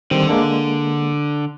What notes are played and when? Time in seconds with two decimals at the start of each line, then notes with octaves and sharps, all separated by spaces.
0.11 D3 D#3 G3 C4
0.29 G#3 A#3 D4